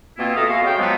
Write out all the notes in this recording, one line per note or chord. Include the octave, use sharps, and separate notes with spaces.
B2 A#3 C4 E4 F4
F4 A4 E5 F5 A#5 D#6
G#3 F#4 E5 F5
C#3 B3 F5 G5
F3 F#3 G#3 A3 B3 F#4